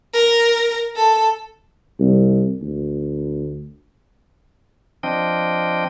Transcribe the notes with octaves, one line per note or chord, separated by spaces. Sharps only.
A#4
A4
C2
D2
F3 C4 D4 D#5 G5